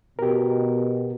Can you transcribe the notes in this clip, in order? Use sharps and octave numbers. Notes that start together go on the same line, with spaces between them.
B2 G4 A#4